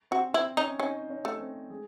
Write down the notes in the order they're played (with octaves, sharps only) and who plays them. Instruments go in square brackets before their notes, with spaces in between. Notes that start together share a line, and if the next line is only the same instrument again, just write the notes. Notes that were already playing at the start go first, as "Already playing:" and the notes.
[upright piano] C4 C5 [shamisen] F#4
[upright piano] C4 C5 [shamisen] E4
[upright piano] C#4 C#5 [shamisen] D#4
[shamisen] C#4 [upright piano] D#4 D#5
[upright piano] C#4 C#5
[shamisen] A3
[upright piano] C4 C5
G#3 G#4